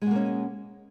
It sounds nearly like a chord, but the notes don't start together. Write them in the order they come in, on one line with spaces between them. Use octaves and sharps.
G#3 B2 A#3 C#4